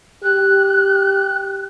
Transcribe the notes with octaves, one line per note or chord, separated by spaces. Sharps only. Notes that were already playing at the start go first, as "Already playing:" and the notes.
G4 F#6